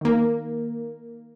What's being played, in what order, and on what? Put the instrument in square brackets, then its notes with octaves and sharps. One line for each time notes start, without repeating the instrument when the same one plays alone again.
[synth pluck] D#3 A#3